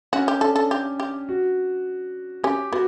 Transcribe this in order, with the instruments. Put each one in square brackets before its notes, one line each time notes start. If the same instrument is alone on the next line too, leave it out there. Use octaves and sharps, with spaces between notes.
[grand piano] C#4 [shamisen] F#4
[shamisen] G4
[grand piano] D4 [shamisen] A4
[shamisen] A4
G4
G4
[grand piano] F#4
[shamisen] C#4 [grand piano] G4
[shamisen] B3 [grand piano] F#4